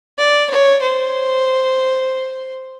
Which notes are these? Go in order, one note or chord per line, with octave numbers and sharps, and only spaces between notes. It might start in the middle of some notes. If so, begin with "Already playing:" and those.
D5
C#5
C5